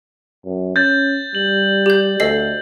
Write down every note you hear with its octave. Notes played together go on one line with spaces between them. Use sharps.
F#2
C#4 G6 A6
G3 F#7
G4 G6
D2 A4 D#5 C7